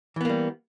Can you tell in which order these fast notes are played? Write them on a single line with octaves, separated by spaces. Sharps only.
E3 B3 A#3 G3